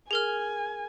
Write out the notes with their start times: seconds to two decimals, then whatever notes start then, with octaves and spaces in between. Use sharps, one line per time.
0.11 G#4 A#4 G#5 F6